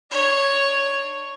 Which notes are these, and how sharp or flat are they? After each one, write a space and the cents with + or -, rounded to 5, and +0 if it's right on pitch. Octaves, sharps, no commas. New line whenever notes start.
D4 +35 C#5 +0